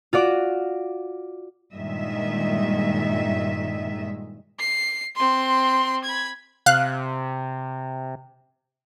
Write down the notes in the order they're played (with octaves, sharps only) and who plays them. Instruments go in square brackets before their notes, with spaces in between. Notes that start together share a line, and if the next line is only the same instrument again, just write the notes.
[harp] F4 F#4 D5 D6
[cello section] G2 A#2 D#3 G#3 D#5 E5
[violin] C7
C4 C6
B5 G#6
[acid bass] C3 [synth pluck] F5 F#6